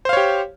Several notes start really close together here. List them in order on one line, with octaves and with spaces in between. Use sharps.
C5 F5 C#5 G4